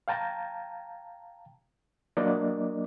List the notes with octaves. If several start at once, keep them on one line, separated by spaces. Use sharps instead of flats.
F5 G5 A5 A#5
F#3 A#3 D4 A#4 D5 D#5